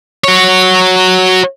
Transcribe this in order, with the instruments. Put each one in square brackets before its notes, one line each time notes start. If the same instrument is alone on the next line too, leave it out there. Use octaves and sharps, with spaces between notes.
[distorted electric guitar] F#4 C#5